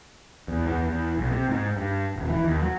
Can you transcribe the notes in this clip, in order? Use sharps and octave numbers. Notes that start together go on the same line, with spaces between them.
E2
E2
E2
B1
C3
G#2
G2
D#1
E3
D#2
F#3